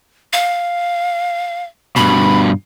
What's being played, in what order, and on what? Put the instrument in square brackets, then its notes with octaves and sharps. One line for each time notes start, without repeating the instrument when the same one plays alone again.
[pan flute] F5
[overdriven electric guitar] G2 B2 [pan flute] B5